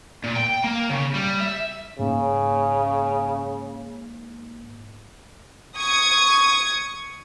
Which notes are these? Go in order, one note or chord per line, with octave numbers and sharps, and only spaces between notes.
A#2
G5
A#3
C#3
G3
E5
G#2 C#3 A#3
C#6 D#6 G#6